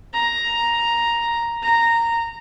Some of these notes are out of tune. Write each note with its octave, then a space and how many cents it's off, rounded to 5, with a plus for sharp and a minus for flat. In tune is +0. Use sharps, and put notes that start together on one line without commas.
A#5 +5
A#5 -10